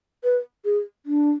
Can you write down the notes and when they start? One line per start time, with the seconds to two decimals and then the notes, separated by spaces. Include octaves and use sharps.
0.24 B4
0.65 G#4
1.06 D4